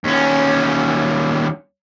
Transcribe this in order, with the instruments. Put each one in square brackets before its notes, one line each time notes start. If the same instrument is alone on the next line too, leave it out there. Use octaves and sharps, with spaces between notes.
[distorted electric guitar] D#2 C#4